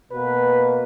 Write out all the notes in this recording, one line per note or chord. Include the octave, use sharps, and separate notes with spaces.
B2 A#3 B4